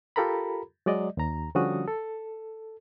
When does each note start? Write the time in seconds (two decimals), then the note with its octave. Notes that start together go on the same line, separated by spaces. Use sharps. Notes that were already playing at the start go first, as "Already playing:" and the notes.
0.16 F4 G4 A4 A#4 A#5 B5
0.86 F#3 G#3 D5 D#5
1.17 D#2 A#5
1.55 D3 F3 G3 C#4 F#4 D#6
1.88 A4